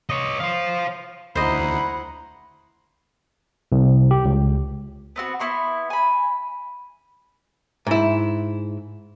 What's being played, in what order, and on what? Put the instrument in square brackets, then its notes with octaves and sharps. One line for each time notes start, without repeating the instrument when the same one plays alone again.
[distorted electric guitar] C#5 D#5
C5 F5
[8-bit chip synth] D2 [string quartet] E4 F#5 A#5 [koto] C5 D#5 [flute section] B5
[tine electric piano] C2
G4
C#2
[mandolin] B3 C4 F#4
B3 E4 C6 C#6
G#5 B5
[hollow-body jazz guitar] G#2 E4